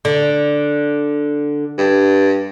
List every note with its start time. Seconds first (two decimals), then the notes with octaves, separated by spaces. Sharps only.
0.05 D3
1.78 G2